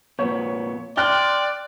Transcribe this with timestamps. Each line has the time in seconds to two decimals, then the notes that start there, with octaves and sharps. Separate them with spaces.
0.19 F2 A#2 B3 C#5
0.97 D5 G5 C6 F6 F#6